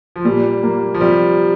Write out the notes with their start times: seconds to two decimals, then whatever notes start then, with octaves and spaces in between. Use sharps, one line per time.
0.16 F3
0.25 A#2 G3
0.63 A#3
0.94 F3
1.01 C3 G3